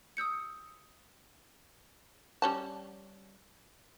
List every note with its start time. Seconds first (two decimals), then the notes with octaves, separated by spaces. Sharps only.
0.17 D#6 E6 G6 C#7
2.42 G3 C#4 A5